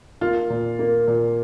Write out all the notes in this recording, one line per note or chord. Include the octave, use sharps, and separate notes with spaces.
A#3 F4
A#2
A#3
A#2